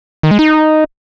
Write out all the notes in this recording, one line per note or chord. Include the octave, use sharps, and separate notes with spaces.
D#3
G#3
D#4